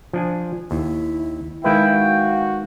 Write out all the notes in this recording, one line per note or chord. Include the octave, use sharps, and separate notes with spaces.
F3 D4 G#5
D#2 E4
D#3 G#3 E4 B4 F5 G5
F#4